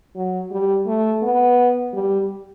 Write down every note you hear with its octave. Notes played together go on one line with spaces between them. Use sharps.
F#3
G3
A3
B3
G3